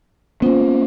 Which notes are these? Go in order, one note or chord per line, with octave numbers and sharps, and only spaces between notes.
A#3 B3 C#4 F4 C5